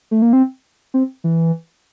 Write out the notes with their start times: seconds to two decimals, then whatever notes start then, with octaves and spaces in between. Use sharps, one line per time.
0.11 A3
0.22 A#3
0.33 C4
0.94 C4
1.24 E3